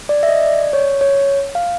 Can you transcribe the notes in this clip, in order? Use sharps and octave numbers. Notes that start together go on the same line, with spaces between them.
D5
E5
D#5
D5
C#5
C#5
F5